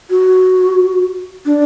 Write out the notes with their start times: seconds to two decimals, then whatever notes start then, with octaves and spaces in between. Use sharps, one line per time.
0.10 F#4
1.46 D4